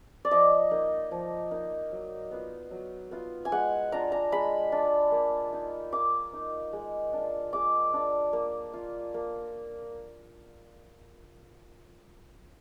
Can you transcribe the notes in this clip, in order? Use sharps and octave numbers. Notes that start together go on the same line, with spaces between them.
D5
F3 D#5
A#3 D#4
F3
A#3 D#4
F#3
B3 F4
F#3
B3 F4
G#5
G#3 F#5
D4 F4 A#5
A#5
G#3 B5
D4 F4
A#3
D#4
A#3 D6
D#4
G#3
D4 F4
G#3 D6
D4 F4
A#3
F4
A#3